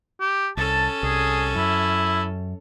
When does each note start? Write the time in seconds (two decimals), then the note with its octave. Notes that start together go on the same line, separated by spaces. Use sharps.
0.20 G4
0.57 C2 C#4 A4 A5
1.03 C2 G#4
1.56 F#2 E4